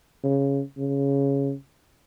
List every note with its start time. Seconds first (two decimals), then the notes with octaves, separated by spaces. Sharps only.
0.23 C#3
0.78 C#3